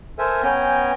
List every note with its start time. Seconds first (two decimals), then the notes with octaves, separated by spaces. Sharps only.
0.18 A4 A#4 C5 E5 G#5
0.43 B3 C#4 G5 G#5 A#5 G6